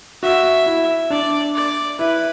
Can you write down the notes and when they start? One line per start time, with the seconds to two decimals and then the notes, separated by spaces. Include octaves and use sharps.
0.23 F#4 E5
0.66 E4
1.10 D4 D5
1.55 D5
1.99 E4 B4